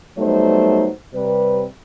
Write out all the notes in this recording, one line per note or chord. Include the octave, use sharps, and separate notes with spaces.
F#3 G3 A3 B3 D#4 C5
C3 G3 B4